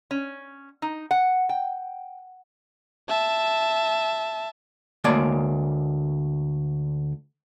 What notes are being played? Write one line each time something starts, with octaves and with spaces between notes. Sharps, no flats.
C#4
D#4
F#5
G5
E5 A5
D2 G#3 A#3 C#5 D5 A5